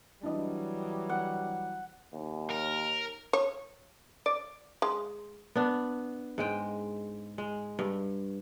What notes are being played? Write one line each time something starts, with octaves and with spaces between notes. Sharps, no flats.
E3 F#3 G3 D4 E4 D#5
F#5
D#2
A#4
C#5
D5
G#3
B3 D4
G#2 G#3 G5
G#3
G2